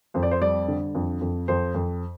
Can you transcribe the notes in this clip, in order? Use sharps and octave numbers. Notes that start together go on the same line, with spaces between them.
F2 C5
D5
C5
G3 D5
D3
F2
F2
F2 C5
F2